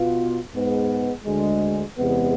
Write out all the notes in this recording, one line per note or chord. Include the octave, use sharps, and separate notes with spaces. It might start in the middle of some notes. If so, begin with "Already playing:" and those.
Already playing: B2 B3 F4
G#2 G#3 B3
D2 D3 G#3
E2 C3 G#3 B3